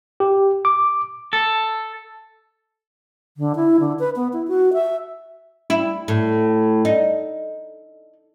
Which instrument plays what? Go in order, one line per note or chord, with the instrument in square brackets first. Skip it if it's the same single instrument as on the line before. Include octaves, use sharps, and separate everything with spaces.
[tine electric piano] G4
D6
[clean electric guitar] A4
[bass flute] D3
E4
D3
B4
B3
E4
F#4
E5
[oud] E4
A2
D#4